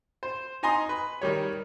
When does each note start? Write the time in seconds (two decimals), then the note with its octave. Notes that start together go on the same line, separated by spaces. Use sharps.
0.23 C5
0.63 D#4 D#5 G#5 A#5 C6 D#6
0.89 B4
1.22 D#3 G3 C#5